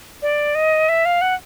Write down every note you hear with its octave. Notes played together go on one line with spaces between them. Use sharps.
D5
D#5
E5
F5
F#5